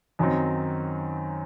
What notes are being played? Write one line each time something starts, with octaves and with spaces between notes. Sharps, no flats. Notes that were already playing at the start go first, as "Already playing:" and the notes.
F#2 D#3 F#3 C4 D#4